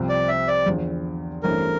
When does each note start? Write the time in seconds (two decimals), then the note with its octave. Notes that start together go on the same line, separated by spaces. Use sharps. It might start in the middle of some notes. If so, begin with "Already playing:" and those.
Already playing: C2 C3 F3 C4
0.09 D5
0.28 E5
0.48 D5
0.66 E2 D3 F3
1.43 A1 G2 E3 A3 C4 A#4